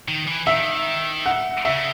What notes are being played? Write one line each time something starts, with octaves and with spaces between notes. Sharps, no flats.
D#3
E3
D#3 E5
F#5
C#3 E5